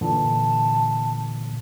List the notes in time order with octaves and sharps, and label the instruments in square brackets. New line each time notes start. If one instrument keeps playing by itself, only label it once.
[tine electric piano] A#2 D3 E3 [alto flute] A5